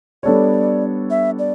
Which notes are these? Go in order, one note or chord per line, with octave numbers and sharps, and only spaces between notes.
G3 B3 D4 A4 C#5 D5
E5
D5